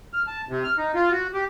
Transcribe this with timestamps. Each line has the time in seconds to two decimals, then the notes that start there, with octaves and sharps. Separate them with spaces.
0.13 F6
0.27 A5
0.49 C3
0.64 F6
0.78 D#4
0.95 F4
1.11 F#4
1.34 G4